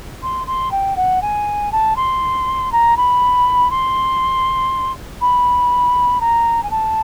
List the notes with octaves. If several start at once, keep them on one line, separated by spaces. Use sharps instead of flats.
C6
C6
G5
F#5
G#5
A5
C6
A#5
B5
C6
B5
A#5
G#5
A5